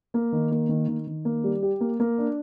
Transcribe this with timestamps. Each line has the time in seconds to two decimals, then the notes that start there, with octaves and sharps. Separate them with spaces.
0.14 A#3
0.33 D#3
0.51 A#3
0.69 D#3
0.88 D#3
1.07 D#3
1.25 A#3
1.44 G3
1.63 G4
1.80 A#3
2.00 A#3
2.18 D4